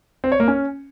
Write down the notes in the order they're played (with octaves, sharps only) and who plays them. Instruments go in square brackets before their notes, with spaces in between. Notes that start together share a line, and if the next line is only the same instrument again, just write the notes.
[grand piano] C4
C#5
A#3
C#4